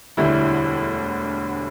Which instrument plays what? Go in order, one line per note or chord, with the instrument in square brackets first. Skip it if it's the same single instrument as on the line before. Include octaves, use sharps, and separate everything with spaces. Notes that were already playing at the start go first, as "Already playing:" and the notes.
[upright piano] E1 D2 D3 G3 E4